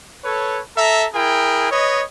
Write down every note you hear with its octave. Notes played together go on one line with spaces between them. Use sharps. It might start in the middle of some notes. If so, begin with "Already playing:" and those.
A4 B4 C#5
A4 E5 A#5
E4 G#4 A#4 G5
B4 C#5 D#5